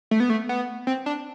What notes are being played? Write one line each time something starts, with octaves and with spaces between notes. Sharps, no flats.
A3
B3
A3
B3
C4
D4